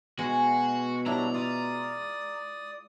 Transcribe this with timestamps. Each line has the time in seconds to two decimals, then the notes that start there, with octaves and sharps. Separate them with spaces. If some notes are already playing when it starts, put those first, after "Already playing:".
0.19 B2 G#3 F#4
1.06 F#3 G3 D4 E4 A#5
1.34 F4 D5 D#6